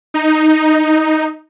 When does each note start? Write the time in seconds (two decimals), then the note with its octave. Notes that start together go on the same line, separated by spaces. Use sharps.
0.14 D#4